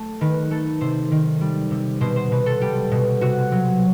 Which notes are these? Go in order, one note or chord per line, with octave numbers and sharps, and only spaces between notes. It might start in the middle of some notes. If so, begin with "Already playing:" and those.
Already playing: A3 A4
D#3 B4
A3 A4
C3 C5
D#3
G3
C3
B2 C5
C5
B2 B4
A4
G3 G4
B2
C3 F#4
F#3